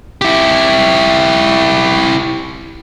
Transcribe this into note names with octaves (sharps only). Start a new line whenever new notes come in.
E4 G4